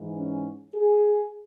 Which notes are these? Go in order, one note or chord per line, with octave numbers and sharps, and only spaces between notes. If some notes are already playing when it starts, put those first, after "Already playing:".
Already playing: G#2 E3 G#3
C#4
G#4